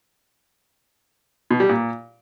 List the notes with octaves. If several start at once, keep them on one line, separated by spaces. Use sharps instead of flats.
B2
G3
A#2